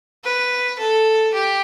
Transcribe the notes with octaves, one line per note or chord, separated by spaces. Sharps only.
B4
A4
G4